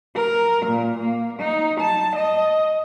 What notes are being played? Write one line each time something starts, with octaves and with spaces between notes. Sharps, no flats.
A#4
A#2
A#3
D#4
A5
D#5